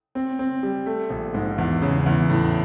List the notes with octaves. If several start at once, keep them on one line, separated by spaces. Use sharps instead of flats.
C4
C4
G3
A3
A#1
G#2
E2
C#3
E2
A2